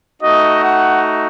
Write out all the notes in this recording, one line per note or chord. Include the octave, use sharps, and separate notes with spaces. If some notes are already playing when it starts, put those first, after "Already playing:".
A3 D#4 F#4 D#5
F#5